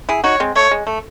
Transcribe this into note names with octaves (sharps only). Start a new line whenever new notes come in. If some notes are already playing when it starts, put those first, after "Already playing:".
E4 G#4
D#4 F#4 C#5
G#3 C4
A3 C#5
G#3
A3